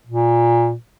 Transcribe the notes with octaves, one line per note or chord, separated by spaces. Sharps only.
A#2